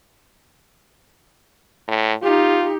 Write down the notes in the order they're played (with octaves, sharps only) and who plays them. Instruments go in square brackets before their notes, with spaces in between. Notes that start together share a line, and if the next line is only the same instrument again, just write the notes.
[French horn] A2
[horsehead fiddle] D#4 G4 [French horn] F4